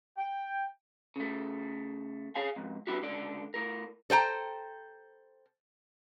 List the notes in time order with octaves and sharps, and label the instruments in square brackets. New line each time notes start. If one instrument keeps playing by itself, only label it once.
[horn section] G5
[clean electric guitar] C#3 A3
G#4 C#5 F5 G#5
F2 G#2
G3 B3 D4 E4 F#4 G4
C#2 D3 D5
A2 A#4
[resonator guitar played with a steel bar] A4 C5 G5 A#5